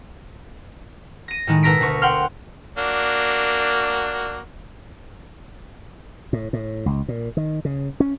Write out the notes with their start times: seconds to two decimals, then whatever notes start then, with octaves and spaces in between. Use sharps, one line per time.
1.28 A#6 D#7
1.47 A2 D#3 G#3
1.63 B2 A4 A#4 A#6 B6 D7
1.81 D2 C#6
2.02 F#5 G5 C6 F6
2.78 A#3 D4 F#4
6.33 A2
6.53 A2
6.86 C#2
7.08 A#2
7.37 D#3
7.65 C#3
8.00 C#4